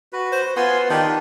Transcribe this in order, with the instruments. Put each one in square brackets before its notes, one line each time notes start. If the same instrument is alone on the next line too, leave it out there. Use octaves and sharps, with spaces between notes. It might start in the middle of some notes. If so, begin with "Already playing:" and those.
[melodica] F#4 B4
[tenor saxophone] C5
[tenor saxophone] B3 [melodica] F4 G#5 C6
[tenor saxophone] D#3 [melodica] D4 F4 G4